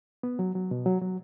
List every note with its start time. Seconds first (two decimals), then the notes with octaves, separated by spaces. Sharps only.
0.23 B3
0.39 F#3
0.55 F#3
0.71 B2
0.86 F#3
1.02 F#3